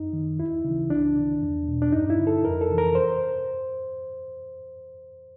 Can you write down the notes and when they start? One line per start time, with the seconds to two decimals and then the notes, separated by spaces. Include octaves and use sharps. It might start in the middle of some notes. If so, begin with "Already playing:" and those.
Already playing: F#2 D#4
0.13 D#3
0.38 D#2 E4
0.65 C#3 E3
0.90 C2 D4
1.16 C3 D#3
1.42 E2
1.68 B2
1.82 D4
1.92 G2 D#4
2.10 E4
2.19 D3
2.27 A4
2.45 F2 A#4
2.61 A4
2.69 C3 E3
2.78 A#4
2.95 C5